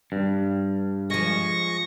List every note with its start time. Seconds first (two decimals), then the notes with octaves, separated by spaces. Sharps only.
0.12 G2
1.10 F3 G#3 C#6 A#6